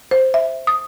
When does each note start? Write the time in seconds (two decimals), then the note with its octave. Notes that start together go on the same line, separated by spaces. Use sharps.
0.11 C5
0.34 E5
0.67 D#6